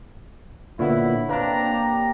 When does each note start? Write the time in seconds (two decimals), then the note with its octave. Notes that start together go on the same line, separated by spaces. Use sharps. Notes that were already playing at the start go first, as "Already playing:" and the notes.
0.79 A#2 D3 B3 E4 C#5 F#5
1.29 A#3 C4 D4 B4 A#5 D6
1.64 G4